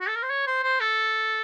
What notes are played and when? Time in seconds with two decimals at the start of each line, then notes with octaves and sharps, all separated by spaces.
0.01 F#4
0.08 A4
0.16 A#4
0.23 C5
0.30 C#5
0.47 C5
0.63 C5
0.80 A4